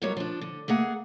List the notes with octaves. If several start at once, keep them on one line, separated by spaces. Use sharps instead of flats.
G#2 F#3 G3 B3 A#4 C#5
F3 D4
D3
A3 A#3 G#4 F#5